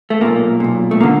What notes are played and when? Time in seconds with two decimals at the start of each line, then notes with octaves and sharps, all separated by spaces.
0.10 A3
0.21 B1 A#2 A#3
0.60 B1 A#2
0.91 A3
1.00 A#3
1.03 D3